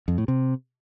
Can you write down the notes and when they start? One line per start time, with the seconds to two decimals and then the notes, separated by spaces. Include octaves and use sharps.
0.08 F2
0.18 A2
0.28 C3